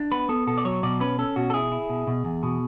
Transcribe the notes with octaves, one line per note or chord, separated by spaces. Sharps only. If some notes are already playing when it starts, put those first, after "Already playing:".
Already playing: D4
B3 B4
B3 A4
B2 A4
D5
F#3 C#5
B2 D5
C#4 B4
C#4 A4
B2 F#4
A4
E4 G#4
E4
B2
B2
E2
B2